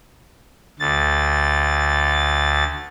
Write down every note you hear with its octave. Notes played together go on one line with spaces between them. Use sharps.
D2 A6